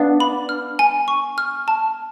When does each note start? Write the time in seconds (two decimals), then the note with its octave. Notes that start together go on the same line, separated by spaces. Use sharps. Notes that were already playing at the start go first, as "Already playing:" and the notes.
Already playing: B3 D4 F5
0.20 B5
0.49 F6
0.79 G#5
1.08 C#6
1.38 F6
1.68 A5